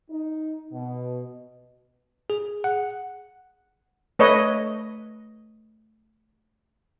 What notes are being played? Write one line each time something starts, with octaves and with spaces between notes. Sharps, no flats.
D#4
B2
G#4
F#5
A3 B4 C#5 D#5